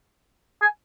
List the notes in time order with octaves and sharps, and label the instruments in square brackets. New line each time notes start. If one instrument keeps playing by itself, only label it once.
[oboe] G#5